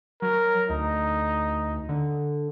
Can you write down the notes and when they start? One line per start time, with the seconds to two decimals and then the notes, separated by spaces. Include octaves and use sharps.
0.22 F#3 A#4
0.70 D2 D#4
1.89 D3